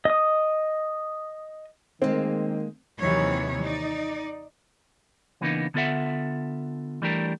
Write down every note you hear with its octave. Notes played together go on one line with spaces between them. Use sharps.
D#5 D#6
D#3 G#3 A#3 C4
D#2 C3 D#3 E3 F#3 C#5
D#4 D5
C#3 E3 A#3 B3 D4 D#4
D3 B3 F4 A4 E5 F#5
E3 G3 A3 D4 G4 A#4